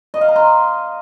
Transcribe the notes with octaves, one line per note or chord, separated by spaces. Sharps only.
D#5
F5
A#5
C6